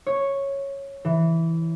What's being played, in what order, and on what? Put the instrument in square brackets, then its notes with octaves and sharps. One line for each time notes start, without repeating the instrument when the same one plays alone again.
[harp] C#5
E3